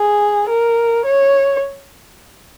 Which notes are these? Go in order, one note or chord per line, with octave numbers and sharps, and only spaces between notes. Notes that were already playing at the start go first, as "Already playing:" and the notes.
Already playing: G#4
A#4
C#5